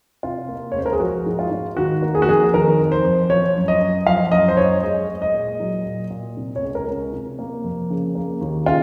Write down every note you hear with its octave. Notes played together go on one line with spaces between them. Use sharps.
C3 F4
A#3
C#5
C#2 C5
A#4
G#4
F3 F#4
G#2
F4
G#2
D#3 F#4
A#3
G#4
F#4
F2 G#4
D#3 A#4
F2
C5
F2
F3 C#5
F#2
D#5
F#2
F3 F5
F#2 D#5
C5
F#2 C#5
G#3 D#5
G#3
D#5
A#2
F#3
A#2
A#2
C3
C#5
C#2
A#4
C#2
C3
A#3
F2
C#3
A#3
D#2
C#3 F4